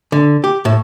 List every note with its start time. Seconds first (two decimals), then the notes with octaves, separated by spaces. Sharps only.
0.12 D3
0.44 G4
0.65 A2